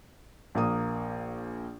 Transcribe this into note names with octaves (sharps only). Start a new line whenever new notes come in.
A#1 A#3 D#6